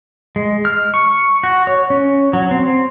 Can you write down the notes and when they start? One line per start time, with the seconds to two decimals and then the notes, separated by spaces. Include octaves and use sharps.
0.36 G#3
0.65 F6
0.94 C#6
1.44 F#4
1.67 C#5
1.90 C#4
2.33 F#3
2.51 C4